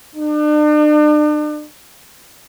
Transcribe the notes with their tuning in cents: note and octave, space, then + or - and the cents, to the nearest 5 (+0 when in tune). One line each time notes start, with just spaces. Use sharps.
D4 +40